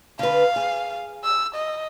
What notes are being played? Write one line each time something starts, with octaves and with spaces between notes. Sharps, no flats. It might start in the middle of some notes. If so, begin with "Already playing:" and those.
D3 B4 F5
G#4
E6
D#5